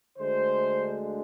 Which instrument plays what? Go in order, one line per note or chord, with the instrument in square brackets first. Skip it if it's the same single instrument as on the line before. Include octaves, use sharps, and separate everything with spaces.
[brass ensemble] D2 D3 G#3 C5